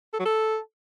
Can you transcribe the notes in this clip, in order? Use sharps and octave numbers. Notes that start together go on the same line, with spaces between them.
A4
F#3
A4